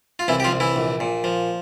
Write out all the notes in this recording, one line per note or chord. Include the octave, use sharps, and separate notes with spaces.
F4
C2 E3 E4
G4
F3 F4
C2
E3 E4
A#1
A#2
F3